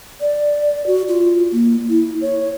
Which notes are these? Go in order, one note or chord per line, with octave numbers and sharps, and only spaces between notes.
D5
F#4
F4
A#3
E4
C#5